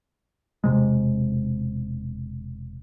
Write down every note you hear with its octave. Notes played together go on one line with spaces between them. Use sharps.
E1 C3 G#3